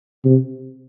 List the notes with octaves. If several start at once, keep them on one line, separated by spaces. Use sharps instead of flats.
C3